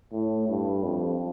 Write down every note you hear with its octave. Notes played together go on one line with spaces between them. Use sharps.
A2
G2
F2